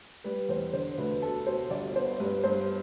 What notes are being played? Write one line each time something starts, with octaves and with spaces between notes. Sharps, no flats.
G3 B4
E2 C5
D3 C5
D2 B4
B2 A4
B2 C5
G1 D5
B3 C5
G2 B4
G2 C5